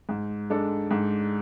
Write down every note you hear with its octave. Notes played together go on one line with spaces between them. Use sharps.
G#2
G#3 D4 A4
G#2